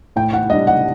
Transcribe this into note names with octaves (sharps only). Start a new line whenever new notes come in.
A2 G5
F#5
G3 D4 D#5
F#5